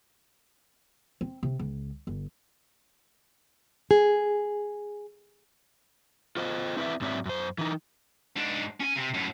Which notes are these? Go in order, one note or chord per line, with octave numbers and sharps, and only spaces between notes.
C4
C3
C#2
G1
G#4
F4 C5 D#5
C4 E4 B4 D5 E5
G#2 F#3 C4 C#5 D5 E5
F#2 C5
E3 D#4
G#2 D4
C#4 G#5
C3
F#2 A2